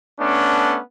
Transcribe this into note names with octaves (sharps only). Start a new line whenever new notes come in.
A3 B3 C#4 D4